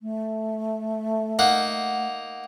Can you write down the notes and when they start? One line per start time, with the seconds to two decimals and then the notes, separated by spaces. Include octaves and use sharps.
0.01 A3
1.39 A#3 D#4 F#5